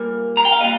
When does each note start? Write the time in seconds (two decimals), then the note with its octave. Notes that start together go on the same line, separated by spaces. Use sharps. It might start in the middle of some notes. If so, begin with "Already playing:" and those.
Already playing: A#2 G3 A#3
0.37 A#5
0.45 G5
0.52 F5
0.60 A#2 G3 A#3 D#5